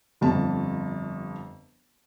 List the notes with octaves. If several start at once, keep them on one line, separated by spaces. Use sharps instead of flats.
G1 F2 A5